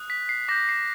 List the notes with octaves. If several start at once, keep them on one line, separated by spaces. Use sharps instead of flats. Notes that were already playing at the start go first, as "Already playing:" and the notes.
Already playing: D#6 F#6
B6
C7
D6 G6 A#6
C7